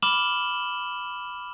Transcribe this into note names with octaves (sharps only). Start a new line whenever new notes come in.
B5 D6 F6 E7 F#7 G7